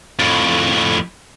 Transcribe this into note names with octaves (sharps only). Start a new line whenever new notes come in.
F2 A2